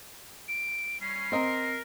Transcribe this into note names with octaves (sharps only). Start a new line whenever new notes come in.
D7
G3 C#4 C7
C4 A#4 D#5 A#5